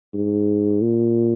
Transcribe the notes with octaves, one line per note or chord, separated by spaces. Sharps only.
G#2
A#2